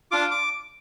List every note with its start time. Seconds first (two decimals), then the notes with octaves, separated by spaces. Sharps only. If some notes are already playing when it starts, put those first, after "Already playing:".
0.11 D4 F4 D6
0.31 D6